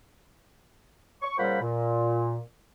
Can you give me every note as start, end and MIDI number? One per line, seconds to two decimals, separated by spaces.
1.22 1.38 85
1.38 1.61 46
1.38 1.61 49
1.38 1.61 55
1.38 1.61 72
1.38 1.61 78
1.38 1.61 83
1.62 2.39 46